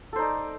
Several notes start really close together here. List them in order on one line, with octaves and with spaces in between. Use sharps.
A4 C5 D#4 D5